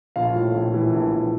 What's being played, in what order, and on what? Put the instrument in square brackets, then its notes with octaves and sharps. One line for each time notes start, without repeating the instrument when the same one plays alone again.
[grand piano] A#1 F4 F5
A2
A#1
E3
A#1
A#1